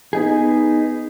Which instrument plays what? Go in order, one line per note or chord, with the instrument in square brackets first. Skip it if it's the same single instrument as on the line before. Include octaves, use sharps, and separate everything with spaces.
[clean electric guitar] B3 D#4 G#4